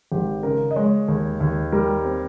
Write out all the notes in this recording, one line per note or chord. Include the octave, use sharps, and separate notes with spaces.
G#1 G4
C#3 A#4
D#5
G#3 C#5
D#2 G#4
D#2
G3 A#4
C4